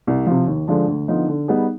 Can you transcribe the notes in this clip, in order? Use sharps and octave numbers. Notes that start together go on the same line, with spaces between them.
C2
C3 F3
D#2
D3 F3 G#3 D4
D2
D3 F3 B3 D#4
D3
G3 B3 D#4 G#4